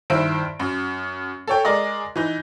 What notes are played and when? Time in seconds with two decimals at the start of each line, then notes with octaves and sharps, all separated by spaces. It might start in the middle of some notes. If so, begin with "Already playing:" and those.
0.10 G2 D#3 E4 C5 E5 D7
0.60 F#2
1.47 A4 C#5 G5
1.65 G#3 A#4 D5 D#5
2.16 E3 D#4